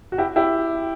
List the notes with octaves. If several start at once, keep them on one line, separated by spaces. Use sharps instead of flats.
F#4
E4 G4
E4 G4